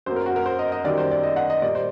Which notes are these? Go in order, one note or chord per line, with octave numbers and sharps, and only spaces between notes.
F#2 F#3 A#3 C5
A#4
F#4
A#4
C5
D#5
D#5
F#2 D#3 G3 A#3 D5
C5
D5
D#5
F#5
D#5
A#2 G3 A#3 D5
C5